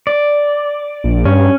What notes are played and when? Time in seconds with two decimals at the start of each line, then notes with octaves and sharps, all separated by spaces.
0.07 D5
1.04 A#1
1.25 G2 C#4